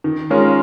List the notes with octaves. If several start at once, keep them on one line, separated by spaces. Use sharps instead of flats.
D#3
G#3 C#4 F4 A#4